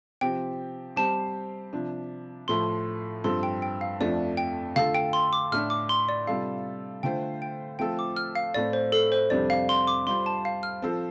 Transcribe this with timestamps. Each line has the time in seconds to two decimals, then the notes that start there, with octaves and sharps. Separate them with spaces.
0.21 C3 F3 C4 G4 G5
0.96 G3 C4 G4 C5 A5
1.73 C3 F3 D4
2.48 A2 F3 A3 C6
3.24 G2 F3 C4 A4 C6
3.43 G5
3.62 G5
3.81 F5
4.00 F2 F3 A3 D4 D5
4.37 G5
4.76 D3 A3 F4 A4 F5
4.95 G5
5.13 C6
5.33 D6
5.52 A2 A3 D4 F6
5.70 D6
5.89 C6
6.09 D5
6.27 C3 G3 F4 A4 F5
7.03 D3 A3 F4 C5 G5
7.42 G5
7.79 F3 A3 C4 F4 A4 G5
7.99 D6
8.16 F6
8.35 F5
8.54 A2 A3 C4 D5
8.73 C5
8.92 A4
9.12 C5
9.30 F2 C3 G3 D4 G4 D5
9.50 F5
9.69 C6
9.87 D6
10.07 G3 F4 C5 C6
10.26 A5
10.45 F5
10.63 F6
10.82 F3 C4 A4 C5